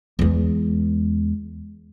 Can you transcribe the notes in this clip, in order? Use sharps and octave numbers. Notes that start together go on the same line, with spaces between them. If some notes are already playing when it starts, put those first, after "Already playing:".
E2 G#3